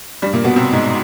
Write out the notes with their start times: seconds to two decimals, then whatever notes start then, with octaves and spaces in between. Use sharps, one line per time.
0.22 G2 G3
0.33 A#2 A#3
0.44 B2 B3
0.56 C3 C4
0.72 G#2 G#3